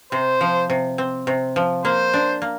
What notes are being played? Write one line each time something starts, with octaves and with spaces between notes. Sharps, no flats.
C3 C5
F3
C3
C4
C3
F3
A#3 C5
D4
A#3